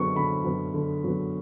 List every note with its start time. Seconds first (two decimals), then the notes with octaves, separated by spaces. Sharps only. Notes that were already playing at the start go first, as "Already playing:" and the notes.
Already playing: D3 F#3 B3 C#6
0.16 D3 B5
0.45 F#3 B3
0.74 D3
1.04 F#3 B3